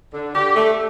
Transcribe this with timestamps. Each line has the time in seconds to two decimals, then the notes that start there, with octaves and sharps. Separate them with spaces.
0.13 D3
0.35 D3 G4
0.56 A3